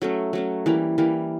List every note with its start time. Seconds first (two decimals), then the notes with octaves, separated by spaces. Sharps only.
0.02 F#3 A3 C#4
0.33 F#3 A3 C#4
0.66 E3 G3 A#3
0.98 E3 G3 A#3